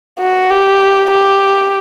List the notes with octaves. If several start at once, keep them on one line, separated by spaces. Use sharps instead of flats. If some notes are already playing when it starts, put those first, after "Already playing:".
F#4
G4
G4